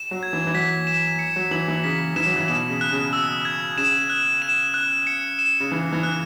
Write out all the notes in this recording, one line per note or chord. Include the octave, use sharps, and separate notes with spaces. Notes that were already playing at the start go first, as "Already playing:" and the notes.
Already playing: E7
F#3
G#6
E3
E3
F#3 B6
E7
C#7
F#3
E3 F#7
E3
C#3 B6
E3 E7
F#3
E3
B2 E7
C#3
F#6
C#3
E6
G#6
C#3 E7
F#6
E7
F#6
C#7
E7
C#3
E3 E7
E3
F#6